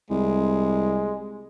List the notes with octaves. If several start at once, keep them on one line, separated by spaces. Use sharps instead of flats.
C2 G#3